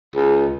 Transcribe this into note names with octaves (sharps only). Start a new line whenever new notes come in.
C#2